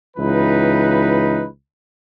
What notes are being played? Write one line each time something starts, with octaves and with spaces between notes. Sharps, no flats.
C#2 E3 D#4 B4